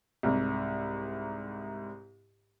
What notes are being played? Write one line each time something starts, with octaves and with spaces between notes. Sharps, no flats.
C2 G#2